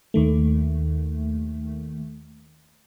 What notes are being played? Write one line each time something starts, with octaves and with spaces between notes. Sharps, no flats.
D#2 D#3 A3